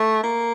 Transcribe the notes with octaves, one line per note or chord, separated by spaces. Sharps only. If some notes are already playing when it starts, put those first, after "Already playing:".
Already playing: A3
A#3